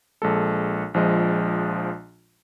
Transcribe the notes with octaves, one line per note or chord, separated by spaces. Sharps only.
A#1 G#3 A4
A#1 F3 G#3 D#5